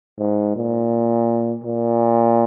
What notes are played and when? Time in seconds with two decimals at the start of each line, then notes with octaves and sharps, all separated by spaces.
0.18 G#2
0.56 A#2
1.64 A#2